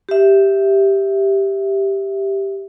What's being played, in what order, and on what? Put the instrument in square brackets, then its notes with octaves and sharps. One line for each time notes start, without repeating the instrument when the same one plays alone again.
[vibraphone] G4 E5